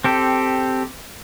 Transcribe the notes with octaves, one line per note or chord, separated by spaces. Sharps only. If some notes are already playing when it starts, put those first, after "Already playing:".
C4 G4 A4